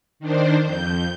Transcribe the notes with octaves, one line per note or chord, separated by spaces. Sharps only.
D#3 D4 C5
F2 G6